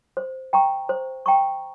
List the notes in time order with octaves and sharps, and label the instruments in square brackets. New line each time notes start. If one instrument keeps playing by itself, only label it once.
[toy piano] C5
G5 A#5 C#6
C5
G5 A#5 C#6